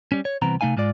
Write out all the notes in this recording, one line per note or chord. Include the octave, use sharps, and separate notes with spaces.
G3 C#4
C#5
C2 E3 B3 C4 A#5
C3 A3 D#4 F5 G#5
G#2 G#3 F4 D5